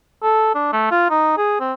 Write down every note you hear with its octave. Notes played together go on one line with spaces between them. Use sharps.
A4
D4
A3
F4
D#4
G#4
C4